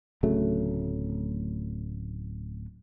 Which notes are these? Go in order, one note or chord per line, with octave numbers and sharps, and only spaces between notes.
D1 C#3 F#3 A3